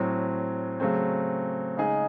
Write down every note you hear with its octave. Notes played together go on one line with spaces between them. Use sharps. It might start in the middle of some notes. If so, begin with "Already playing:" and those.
Already playing: A2 F#3 C4
C#3 F#3 A3 C4
C#3 G#3 D#4 G#4